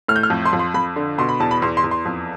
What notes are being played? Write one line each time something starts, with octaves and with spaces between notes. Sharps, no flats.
A2 F6
G6
F6
F2
C6
F2
C6
F2 B5
D3
B2 C6
B5
E2 A5
B5
E2 C6
C6
E2
C6
F2